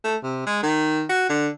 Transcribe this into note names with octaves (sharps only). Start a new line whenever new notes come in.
A3
C3
G#3
D#3
F#4
D3